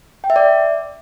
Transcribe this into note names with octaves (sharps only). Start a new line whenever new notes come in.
G5
E5
D5